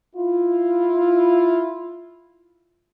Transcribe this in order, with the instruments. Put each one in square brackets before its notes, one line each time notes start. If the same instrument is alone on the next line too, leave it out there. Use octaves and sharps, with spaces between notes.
[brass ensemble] E4 F4